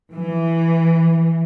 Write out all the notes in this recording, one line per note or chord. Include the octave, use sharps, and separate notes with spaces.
E3